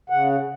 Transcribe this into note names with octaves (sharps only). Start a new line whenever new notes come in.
C#3 F#5